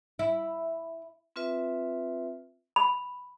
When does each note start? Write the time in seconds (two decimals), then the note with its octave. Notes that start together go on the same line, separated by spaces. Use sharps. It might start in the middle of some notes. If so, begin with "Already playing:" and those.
0.19 E4
1.36 C4 F4 B4 E5
2.76 B5